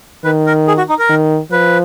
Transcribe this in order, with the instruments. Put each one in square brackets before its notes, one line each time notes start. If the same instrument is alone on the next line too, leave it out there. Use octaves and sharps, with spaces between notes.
[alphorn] D#3 [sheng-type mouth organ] B4
[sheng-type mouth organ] A#4
G#4
F#4
D#4
A#4
[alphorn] D#3
[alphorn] F3 [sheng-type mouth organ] B4